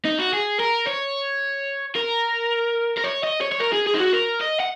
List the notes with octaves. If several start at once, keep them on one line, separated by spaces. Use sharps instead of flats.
D#4
F#4
G#4
A#4
C#5
A#4
A#4
C#5
D#5
C#5
C#5
A#4
G#4
G#4
D#4
F#4
A#4
D#5
F#5